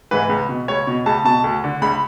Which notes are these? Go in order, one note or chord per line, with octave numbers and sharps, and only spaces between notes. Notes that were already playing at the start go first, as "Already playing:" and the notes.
G#2 E3 B4
C#2
B2
C#2 C#5
B2
C#2 A5
B2 A5
D2
D3
C#2 B5